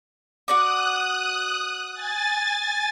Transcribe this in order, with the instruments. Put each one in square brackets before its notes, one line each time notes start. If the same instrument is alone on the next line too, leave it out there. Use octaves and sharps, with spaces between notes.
[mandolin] F#4 D5 D6 [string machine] D#6 F#6
[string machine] G#5 A6